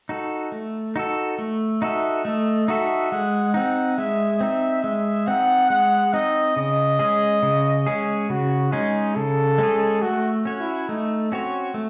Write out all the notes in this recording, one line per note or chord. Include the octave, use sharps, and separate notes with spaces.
D#4 F#4 A4
A3
D#4 F#4 A4
A3
D#4 F#4 A4 E5
A3 D#5
D#4 F#4 A4 E5
G#3 F#5
C4 D#4 F#5
G#3 E5
C4 D#4
G#3 E5
C4 D#4 F#5
G#3 F#5
C4 D#4 D#5
C#3 D#5
G#3 C#4 G#4
C#3
G#3 C#4 G#4
C#3 F#4
G#3 C#4 D#4 G#4
C#3 A4
G#3 C#4 G#4
A3 F#4
C#4 F#4 C#5
E4
A3 D#4
C4 C#4 F#4 C#5
A3